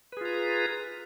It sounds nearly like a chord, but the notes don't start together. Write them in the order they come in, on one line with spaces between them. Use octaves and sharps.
B4 G#4 F4 A#5